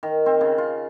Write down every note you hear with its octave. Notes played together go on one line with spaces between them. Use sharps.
D#3
C4
C#3
F4